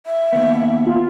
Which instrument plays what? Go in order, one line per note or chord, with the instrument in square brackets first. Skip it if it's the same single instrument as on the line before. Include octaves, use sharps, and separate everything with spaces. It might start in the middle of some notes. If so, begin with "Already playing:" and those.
[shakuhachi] E5
[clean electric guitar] D#2 B3
[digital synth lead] F4